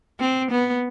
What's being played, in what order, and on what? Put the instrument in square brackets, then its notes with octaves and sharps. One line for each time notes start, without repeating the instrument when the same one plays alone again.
[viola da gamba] C4
B3